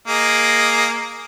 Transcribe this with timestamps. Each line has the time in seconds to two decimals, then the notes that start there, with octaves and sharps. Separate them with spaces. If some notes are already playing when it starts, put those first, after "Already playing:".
0.07 A#3 G#4 D#5